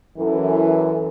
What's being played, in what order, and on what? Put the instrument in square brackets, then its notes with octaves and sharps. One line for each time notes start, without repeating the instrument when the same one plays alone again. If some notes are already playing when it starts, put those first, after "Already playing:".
[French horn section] F#2 E3 A4